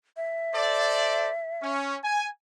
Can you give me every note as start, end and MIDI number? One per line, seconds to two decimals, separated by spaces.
0.17 1.72 76
0.55 1.30 69
0.55 1.30 72
0.55 1.30 74
1.62 1.97 61
2.04 2.29 80